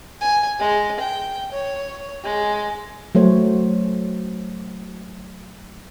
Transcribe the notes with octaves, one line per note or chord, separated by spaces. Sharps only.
G#5
G#3
G5
C#5
G#3
F#3 A3 C5 C#5